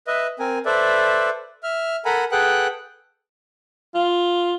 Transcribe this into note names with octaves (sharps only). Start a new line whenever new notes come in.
B4 D#5 E5
C4 A#4 G#5
A4 B4 C5 D5 E5
E5 F6
A4 A#4 F#5 G#5 A#5 B5
G#4 A4 B4 F#5 G5 F#6
F4